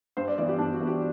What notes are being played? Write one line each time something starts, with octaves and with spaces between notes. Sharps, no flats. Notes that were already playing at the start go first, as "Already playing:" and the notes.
G2 C5
D5
E3 B3 D5
G4
G2 D4
F#4
E3 B3
G4